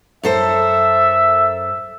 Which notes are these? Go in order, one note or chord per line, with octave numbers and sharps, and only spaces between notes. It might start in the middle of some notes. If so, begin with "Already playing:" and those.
F#2 A4 C5 E5